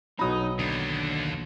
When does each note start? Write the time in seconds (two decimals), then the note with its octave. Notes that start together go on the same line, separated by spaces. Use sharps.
0.19 B1 F#3 D#4 A#5 B5 D#6
0.59 D#2 D3